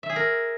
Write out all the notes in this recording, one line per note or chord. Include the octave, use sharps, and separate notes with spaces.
E5
G#4
A#4